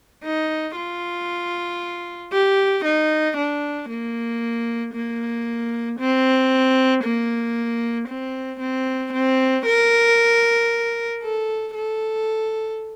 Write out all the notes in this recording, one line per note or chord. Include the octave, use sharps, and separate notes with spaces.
D#4
F4
G4
D#4
D4
A#3
A#3
C4
A#3
C4
C4
C4
A#4
A4
A4